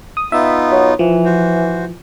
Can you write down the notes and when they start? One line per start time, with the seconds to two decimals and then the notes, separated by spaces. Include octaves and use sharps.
0.17 D#6
0.32 B3 D#4 F4 E5
0.72 F#3
0.99 E3 F3
1.25 F#4 C5